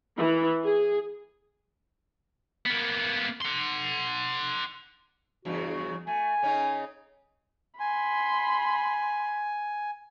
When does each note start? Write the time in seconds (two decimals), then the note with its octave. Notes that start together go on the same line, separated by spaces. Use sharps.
0.17 E3
0.64 G#4
2.66 A#3 B3
3.42 F#5 C6
5.45 E2 G2 C#3 F#4
6.07 A3 G#5
6.43 C#3 C#4 D#4
7.80 G#5 B5 C6